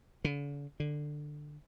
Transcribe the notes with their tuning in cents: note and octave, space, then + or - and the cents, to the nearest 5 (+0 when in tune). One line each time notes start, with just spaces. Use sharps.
D3 -45
D3 +15